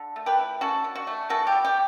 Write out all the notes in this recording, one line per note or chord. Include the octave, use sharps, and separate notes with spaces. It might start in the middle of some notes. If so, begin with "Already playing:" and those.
Already playing: D3
A3
G4 B4
E4
C#4 F#4 A4
D3
F#4
A3
E3 F#4 A4
G4
G3
G4